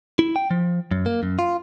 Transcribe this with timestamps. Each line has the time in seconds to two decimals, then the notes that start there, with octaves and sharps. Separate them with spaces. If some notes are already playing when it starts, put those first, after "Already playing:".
0.19 E4
0.36 G5
0.51 F3
0.91 F#2
1.06 A#3
1.23 F#2
1.39 F4